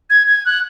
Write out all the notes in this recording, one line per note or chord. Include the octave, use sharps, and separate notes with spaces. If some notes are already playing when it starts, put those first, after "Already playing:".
G#6
G#6
F#6